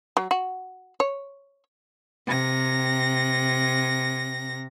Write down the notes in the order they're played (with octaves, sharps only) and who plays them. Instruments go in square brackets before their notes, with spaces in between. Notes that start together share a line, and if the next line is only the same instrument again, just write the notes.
[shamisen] F#3
F#4
C#5
[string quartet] C3 A#6